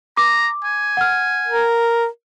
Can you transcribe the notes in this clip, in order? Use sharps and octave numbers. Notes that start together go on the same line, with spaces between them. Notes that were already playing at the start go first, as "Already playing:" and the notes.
A#5 D6
G#5
F#5 F6
A#4